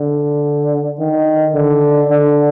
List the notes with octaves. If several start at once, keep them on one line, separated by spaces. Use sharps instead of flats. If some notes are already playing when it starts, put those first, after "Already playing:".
Already playing: D3
D#3
D3
D3